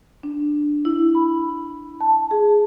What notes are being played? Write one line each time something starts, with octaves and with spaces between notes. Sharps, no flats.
D4
E4
B5
A5
G#4